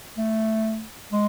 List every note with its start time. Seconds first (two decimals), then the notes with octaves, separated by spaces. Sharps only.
0.18 A3
1.12 G#3